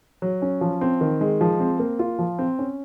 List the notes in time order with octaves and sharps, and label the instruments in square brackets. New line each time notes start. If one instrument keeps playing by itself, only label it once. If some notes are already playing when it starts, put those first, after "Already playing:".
[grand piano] F#3
C#4
F3
C4
D#3
G#3
F3
C4
A#3
F4
F3
C4
C#4